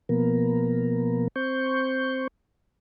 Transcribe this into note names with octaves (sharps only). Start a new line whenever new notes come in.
B2 F3 A#3 B3 A#4
C4 C5 C#6 G6